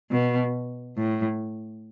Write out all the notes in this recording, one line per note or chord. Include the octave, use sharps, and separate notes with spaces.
B2
A2